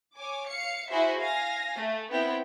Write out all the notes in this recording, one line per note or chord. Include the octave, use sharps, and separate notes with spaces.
C#5 G#5 D6
F5 C#7
E4 F#4 G#4 C5 E5
F5 G#5 A#6
A3
B3 C4 E4 G5